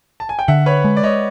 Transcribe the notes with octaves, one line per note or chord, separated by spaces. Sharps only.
A5
G#5
G5
D3 E5 F#5
B4 C#5
G#3
D5
C#5 D#5